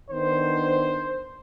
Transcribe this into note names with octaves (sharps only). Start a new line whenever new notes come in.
D#3 B3 D4 C5